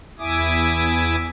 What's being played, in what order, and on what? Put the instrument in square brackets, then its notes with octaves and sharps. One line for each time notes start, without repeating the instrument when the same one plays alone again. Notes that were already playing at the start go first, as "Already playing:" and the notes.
[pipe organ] E2 E4 E5 G#5 D6 D#6